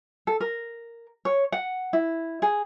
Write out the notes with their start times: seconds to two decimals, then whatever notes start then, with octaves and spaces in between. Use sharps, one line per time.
0.27 A4
0.40 A#4
1.25 C#5
1.52 F#5
1.93 E4
2.42 G#4